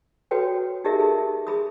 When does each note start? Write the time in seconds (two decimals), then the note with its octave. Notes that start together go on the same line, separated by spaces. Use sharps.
0.31 F#4 A4 B4 C#5 G5
0.84 D#4 G4 G#4 A#4 D#5 E5
0.99 D#4 G#4 A4
1.47 G#4 B5 D#6